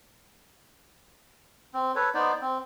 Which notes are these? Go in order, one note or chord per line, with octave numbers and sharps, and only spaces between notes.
C4
A4 B4 C#5
B3 D#4 C5 D5
C4